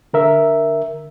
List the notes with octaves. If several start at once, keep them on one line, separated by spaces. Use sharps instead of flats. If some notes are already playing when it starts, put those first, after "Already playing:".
D3 A#4 E5